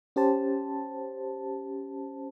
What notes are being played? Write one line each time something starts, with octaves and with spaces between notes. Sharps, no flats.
C#4 G4 C5 A5